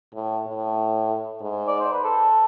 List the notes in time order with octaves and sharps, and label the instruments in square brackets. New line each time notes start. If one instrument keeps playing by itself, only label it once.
[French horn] A2
A2
G#2
[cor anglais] D5
C5
B4
A4